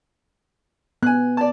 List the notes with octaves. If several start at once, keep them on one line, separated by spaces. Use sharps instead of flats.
B3 G#5 F#6
D5 A5